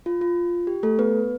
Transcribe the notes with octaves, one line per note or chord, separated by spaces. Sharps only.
F4
F4
G4
A3 A4
B3 B4